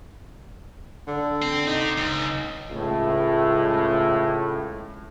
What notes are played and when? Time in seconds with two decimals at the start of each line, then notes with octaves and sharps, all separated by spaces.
1.07 D3
1.42 C4
1.67 C4 D#4 G4
1.98 C#2
2.71 C#2 A2